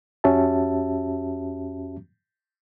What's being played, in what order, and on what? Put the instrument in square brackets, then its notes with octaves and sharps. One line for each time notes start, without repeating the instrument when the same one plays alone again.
[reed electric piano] F2 C#4 F#4 G4 E5 A5